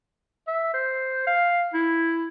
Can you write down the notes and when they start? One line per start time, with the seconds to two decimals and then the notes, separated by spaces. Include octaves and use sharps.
0.47 E5
0.74 C5
1.27 F5
1.74 E4